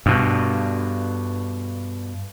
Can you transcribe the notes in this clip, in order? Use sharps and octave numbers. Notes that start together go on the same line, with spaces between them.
G2 B2